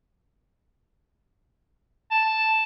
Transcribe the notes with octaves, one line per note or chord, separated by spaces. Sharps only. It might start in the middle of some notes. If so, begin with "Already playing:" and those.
A5